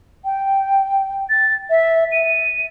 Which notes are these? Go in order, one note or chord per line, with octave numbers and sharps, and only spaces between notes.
G5
A6
E5
D#7